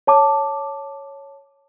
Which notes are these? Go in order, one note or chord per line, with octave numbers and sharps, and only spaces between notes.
C#5 A5 D6